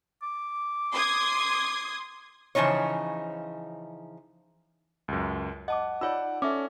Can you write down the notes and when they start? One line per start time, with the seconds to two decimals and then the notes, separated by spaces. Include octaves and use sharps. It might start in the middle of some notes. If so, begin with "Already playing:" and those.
0.23 D6
0.92 C6 D#6 G#6
2.55 C#3 E3 F3 D#4 C#5
5.08 C#2 F#2
5.68 D#5 F#5 A5 D6
6.01 D#4 F4 C#5 D5 F#5 E6
6.42 C#4 A4 D5 E5 D6